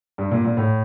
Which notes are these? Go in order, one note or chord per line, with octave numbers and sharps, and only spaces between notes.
G2
A#2
A#2
A2